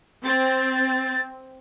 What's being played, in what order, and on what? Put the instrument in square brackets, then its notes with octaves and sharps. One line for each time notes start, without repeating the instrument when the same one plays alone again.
[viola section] C4 [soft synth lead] A6